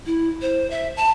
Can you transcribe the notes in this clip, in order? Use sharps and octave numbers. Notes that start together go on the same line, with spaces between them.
E4
C5
E5
A5